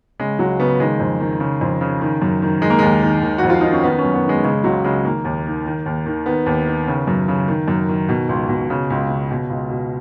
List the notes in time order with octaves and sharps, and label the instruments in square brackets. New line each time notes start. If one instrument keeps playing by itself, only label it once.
[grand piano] C#3 G#3
C#2 F#3
C#3 B3
D#3 G#3
F2
D#3
C#3
F2
C#3
D#3
F#2
D#3
D#3 G#3
A#3
D#2 G#3
D#3
D#3
F2 F#4
F4
D#3 D#4
C#4
D#3 B3
C#4
F#2
B3
D#3
G#3
C#3 G#3
C#2 F#3
C#3 G#3
D#3 A#3
D#2
D#3
D#3
D#2
D#3
D#3 B3
D#2
D#3
C#3
F#2
C#3
D#3
F#2
D#3
B2
C#2
B2
C#3
C#2
C#3
B2
C#2
B2